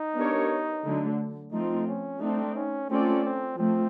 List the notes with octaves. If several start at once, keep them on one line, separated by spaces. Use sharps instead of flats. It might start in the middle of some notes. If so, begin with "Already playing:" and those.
Already playing: D#4
B3 D4 G4 A#4 C#5
D3 F#3 A3
F3 A3 C4 D#4 F4
C#4
A3 C4 D4 D#4
C#4
A3 C4 C#4 F4 A4 D5
C4
F3 A3 C4